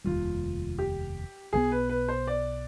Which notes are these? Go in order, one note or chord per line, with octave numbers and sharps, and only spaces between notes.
F1 D#2 D#3 G3 F4
G4
B1 B2 G3 B3 G#4
B4
B4
C5
D5